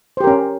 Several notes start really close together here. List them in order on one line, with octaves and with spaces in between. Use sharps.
C5 G4 A#4 C#4